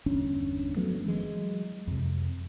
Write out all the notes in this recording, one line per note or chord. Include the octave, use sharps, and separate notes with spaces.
G1 E2 C#4 D4
F3 F#3 A3 B3
E3 F#3 G#3
F2 C3